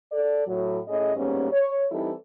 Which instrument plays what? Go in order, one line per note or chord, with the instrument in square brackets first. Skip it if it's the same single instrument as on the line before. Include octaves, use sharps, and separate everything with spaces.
[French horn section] A4 D5
A2 F#3
A2 C#4 G#4 D#5
G#2 G3 A#3 B3 C#4
C#5
E3 G3 C4 D#4 E4 A4